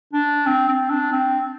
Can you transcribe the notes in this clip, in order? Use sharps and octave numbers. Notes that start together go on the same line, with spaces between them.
D4
C4
C4
D4
C4